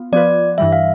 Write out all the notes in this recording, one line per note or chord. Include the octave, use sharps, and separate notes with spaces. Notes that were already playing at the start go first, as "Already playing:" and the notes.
Already playing: B3 F4
F3 B3 F4 B4 D5
G2 E3 G3 E5
F5